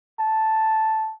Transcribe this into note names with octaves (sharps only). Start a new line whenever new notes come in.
A5